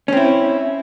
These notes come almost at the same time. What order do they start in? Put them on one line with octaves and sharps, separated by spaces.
C#4 C4 E4